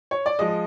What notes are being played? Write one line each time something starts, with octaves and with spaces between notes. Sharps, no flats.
C#5
D5
F3 G#3 D#5